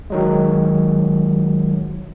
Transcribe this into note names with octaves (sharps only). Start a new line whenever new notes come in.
D#3 F#3 G#3